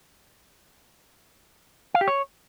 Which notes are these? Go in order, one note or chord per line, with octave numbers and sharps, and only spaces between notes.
F5
G4
C#5